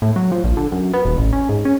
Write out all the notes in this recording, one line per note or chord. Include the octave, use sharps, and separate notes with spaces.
A2
F#3
F3
A#1
D3
F#2
B3
D#1
A1
C#4
G#2
C#4